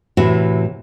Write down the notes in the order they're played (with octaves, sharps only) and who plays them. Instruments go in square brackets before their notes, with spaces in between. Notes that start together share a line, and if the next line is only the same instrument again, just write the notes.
[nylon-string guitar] A2 C3 E3 F#4